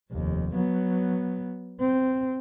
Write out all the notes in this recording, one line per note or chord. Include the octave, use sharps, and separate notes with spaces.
F1 D#2
F#3 B3
C4